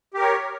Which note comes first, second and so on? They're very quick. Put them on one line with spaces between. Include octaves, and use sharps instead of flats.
G4 A#4 C#5